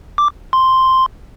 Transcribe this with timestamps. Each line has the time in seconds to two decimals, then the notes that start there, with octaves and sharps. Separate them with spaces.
0.18 D6
0.53 C6